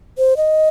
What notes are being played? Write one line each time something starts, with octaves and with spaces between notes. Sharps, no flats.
C5
D#5